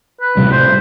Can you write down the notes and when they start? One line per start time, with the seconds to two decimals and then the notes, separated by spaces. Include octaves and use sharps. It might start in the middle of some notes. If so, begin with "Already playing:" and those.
0.21 B4
0.37 A2 C3 G3
0.52 C5